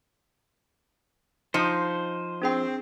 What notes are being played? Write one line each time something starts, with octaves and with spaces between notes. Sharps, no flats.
F3 D#4 C5 C#7
C4 D4 G#4 G5